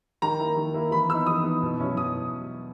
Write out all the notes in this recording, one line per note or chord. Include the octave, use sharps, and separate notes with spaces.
D#3 A#5
A#3 E4
D#3
A#3 E4
E3 B5
B3 D#4 E6
E3 D#6
B3 D#4
B2
F#3 C#4 E4
B2 D#6